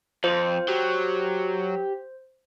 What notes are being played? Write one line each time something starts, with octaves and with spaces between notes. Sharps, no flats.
F2 F4 C5
F#3 G4